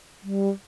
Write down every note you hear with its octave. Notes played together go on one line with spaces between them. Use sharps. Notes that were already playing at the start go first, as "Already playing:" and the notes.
G3